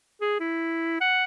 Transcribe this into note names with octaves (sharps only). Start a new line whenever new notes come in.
G#4
E4
F#5